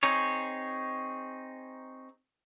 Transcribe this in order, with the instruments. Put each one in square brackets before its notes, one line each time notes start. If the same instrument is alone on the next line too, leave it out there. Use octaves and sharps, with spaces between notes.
[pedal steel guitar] C4 D#4 G#4 C#5